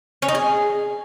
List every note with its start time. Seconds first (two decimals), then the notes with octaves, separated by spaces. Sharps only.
0.22 C#4
0.28 D#4
0.35 G#4